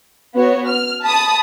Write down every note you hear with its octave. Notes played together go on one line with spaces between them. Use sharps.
B3 F#4 C#5
F6
A5 B5 D#6